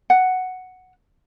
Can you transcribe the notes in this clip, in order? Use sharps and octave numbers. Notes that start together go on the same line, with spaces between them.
F#5